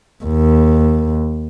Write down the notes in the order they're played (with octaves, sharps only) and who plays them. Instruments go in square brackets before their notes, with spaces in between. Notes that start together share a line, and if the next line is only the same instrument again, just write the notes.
[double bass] D#2